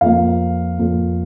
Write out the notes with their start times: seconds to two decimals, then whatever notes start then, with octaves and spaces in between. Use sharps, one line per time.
0.01 F2 F3 A#3 F5
0.79 F2 F3 A#3